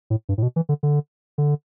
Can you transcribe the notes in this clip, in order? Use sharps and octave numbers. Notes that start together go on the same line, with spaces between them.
A2
G2
A2
B2
E3
D3
D3
D3